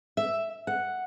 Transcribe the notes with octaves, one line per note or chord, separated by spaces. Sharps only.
E5
F#5